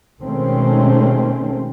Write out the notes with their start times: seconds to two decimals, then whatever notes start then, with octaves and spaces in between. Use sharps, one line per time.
0.22 B2 D#3 G#3 A3 C4 C#4